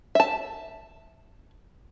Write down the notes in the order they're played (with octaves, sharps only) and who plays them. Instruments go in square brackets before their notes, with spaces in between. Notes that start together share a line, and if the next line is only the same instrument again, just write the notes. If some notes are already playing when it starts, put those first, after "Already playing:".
[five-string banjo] E5 A5